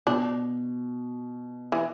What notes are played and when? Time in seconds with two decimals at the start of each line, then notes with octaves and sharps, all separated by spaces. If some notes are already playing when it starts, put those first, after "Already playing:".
0.07 B2 D4
1.72 E3